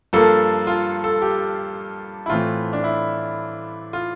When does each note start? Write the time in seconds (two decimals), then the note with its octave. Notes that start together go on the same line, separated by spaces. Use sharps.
0.13 G2 F3 A#3 A4
0.67 F4
1.04 A4
1.22 G4
2.26 E4
2.29 A2 E3 A3 C4 F4
2.73 D4
2.84 E4
3.93 F4